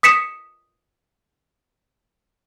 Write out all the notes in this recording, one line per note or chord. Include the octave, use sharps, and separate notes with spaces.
D#6 B6 C#7 E7